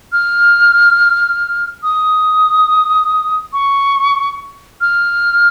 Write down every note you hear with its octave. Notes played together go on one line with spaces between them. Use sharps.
F6
D#6
C#6
F6